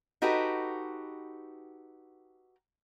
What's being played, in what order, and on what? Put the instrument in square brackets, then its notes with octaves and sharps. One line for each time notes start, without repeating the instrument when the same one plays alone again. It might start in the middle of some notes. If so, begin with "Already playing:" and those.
[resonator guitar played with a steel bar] D#4 F#4 G4 A4 B4